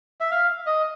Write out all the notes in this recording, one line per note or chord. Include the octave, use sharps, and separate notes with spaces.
E5
F5
D#5